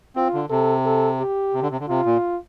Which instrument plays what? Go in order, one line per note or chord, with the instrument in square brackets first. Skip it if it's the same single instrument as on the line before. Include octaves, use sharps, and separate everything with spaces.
[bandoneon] C4 [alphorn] F4
[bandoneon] D3
[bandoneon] C3 [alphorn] A4
[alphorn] A4
G4
[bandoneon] C3
D3
C3
D3
[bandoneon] C3 [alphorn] F4
[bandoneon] A#2